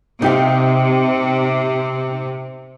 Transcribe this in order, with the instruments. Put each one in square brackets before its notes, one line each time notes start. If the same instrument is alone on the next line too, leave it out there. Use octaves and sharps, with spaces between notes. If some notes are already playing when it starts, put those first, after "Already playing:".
[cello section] C3 [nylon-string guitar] D#4 G4 F5